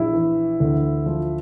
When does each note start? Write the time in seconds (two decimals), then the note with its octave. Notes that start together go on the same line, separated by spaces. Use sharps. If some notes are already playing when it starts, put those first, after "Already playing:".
Already playing: A#1 E4
0.13 E3
0.60 D2
1.06 F3